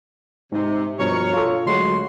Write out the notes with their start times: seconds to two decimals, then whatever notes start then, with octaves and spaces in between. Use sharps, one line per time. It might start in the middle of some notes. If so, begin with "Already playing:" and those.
0.52 G#2 C3 D#4
0.99 G2 B2 F3 A#4 C#5
1.33 F4 A4
1.66 D2 G2 F#3 G#3 F#4 C6